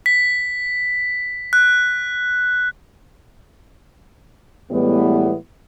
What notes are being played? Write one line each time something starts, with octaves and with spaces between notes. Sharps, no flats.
B6
F#6
A2 E3 G3 G#3 B3